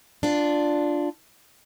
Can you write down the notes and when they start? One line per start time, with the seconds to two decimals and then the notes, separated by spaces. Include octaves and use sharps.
0.23 D4 F4